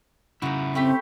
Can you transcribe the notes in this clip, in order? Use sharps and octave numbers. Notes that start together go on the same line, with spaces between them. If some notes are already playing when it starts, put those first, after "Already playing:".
C#3 D#4 E4 F#4
A3 C4 G4 B5